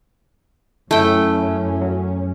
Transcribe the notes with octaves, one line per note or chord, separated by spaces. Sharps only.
F#2 A3 C#4 E4 G5
F#3